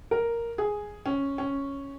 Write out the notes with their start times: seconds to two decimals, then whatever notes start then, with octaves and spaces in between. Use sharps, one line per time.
0.11 A#4
0.58 G#4
1.06 C#4
1.38 C#4